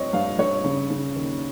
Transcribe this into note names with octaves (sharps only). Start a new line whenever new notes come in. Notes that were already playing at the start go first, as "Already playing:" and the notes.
Already playing: G2 C4 C#5 D#5
G2 F5
G2 C#5
C#3
C#3
D#2